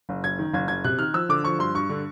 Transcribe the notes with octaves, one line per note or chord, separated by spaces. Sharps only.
F#1
F#1 G#6
D#3
F#1 G#6
F#1 G#6
C3 F#6
D#3 F6
F3 E6
D3 D6
F3 C#6
G2 C6
G2 C#6
D3